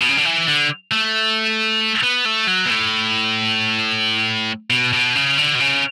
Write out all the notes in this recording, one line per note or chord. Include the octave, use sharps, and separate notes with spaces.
B2
C#3
D3
E3
D3
A3
B3
A3
F#3
B2
A2
B2
B2
C#3
D3
B2
C#3